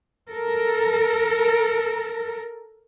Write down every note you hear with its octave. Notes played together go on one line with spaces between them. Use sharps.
A4 A#4